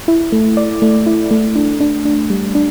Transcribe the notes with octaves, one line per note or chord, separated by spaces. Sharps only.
E4
A3
D5
A3
E4
A3
D4
D4
D4
G3
D4